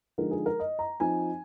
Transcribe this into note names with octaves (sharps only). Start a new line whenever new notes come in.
D3 F3 G#3 D#4 A#4
G#4
A#4
D#5
A#5
F3 C4 D#4 G#5